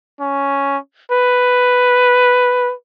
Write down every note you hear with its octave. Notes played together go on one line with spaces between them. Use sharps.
C#4
B4